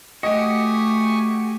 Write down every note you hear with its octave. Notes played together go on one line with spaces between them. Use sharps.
A3 F#4 G4 D#5 G#5 C#6 D#6